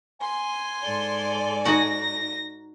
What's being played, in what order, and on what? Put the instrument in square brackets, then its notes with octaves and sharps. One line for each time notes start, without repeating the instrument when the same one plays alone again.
[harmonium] G#5 [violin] C6
[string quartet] G#2 A4 D5
[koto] D#4 F#4 [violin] A#6